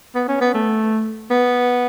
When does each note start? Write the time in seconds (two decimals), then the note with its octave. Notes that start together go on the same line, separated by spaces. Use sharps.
0.15 B3
0.28 C#4
0.41 B3
0.54 A3
1.31 B3